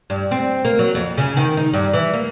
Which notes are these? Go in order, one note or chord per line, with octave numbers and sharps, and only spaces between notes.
G2
C4
A#3
F#3
F2
C#3
D#3
D#4
G2
E3
A#3